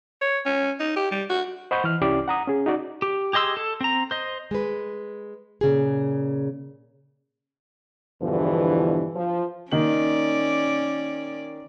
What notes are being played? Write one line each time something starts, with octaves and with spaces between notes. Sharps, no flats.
C#5
C#4
D#4
G4
G3
F#4
C5 D#5 F#5 B5 C#6 G6
E3 F6
C2 C#4 E4 G4 D5 D6
F#5 A#5 D#6
C#4 G#4
D#4 F#4 D5
G4
G4 G#4 D#5 C6 E6
A4
C4 A#5
C5 D#5
G#3 B4
A#2 C#3 G#4
E2 G2 B2 D3 E3 F3
F3
D#3 A#3 C#4 D5 F#7